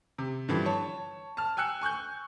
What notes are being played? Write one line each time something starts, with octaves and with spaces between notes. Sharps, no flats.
C3
G2 D3 E3 F3
C#5 A5
A5 F6
G5 G#5 E6 F#6 C#7
G#5 C#6 F#6 G6